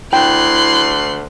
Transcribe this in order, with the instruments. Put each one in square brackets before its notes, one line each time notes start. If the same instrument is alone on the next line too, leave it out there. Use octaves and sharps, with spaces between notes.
[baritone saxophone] D2 [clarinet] E4 [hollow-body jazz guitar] G5 [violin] C6 F#6